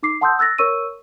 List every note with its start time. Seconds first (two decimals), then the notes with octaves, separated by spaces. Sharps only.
0.03 D#4 D6 C7
0.21 F#5 A5 C6 D#6 E6 G6
0.39 E6 F#6 A6 A#6
0.58 A#4 C#5 C#6 E6 D#7